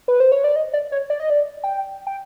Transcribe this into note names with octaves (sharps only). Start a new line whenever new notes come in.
B4
C5
C#5
D5
D#5
D5
C#5
D5
D#5
D5
G5
G5